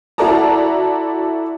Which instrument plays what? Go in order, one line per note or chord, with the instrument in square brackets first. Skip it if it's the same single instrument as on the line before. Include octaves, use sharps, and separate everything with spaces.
[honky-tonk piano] E4 F#4 A4 D5 A5 A#5